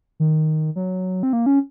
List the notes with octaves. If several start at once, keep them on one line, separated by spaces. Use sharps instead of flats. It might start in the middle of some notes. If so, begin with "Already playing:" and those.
D#3
F#3
C4
A#3
C#4